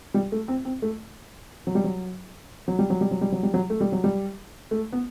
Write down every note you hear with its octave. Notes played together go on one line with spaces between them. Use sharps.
G3
A3
C4
C4
A3
F#3
G3
F#3
F#3
G3
F#3
G3
F#3
G3
F#3
G3
F#3
A3
G3
F#3
G3
A3
B3